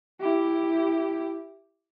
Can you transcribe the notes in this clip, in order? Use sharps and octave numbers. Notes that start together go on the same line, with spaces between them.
E4 G4